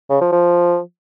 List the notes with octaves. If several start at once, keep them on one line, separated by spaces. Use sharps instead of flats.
C#3
F3
F3